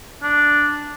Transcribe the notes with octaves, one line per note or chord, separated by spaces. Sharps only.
D4